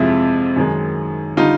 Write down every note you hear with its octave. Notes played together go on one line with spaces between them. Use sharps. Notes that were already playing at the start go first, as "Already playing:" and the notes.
Already playing: F2 C3 F3 G#3 E4
F#2 D#3 G#3
D3 G3 D#4 F4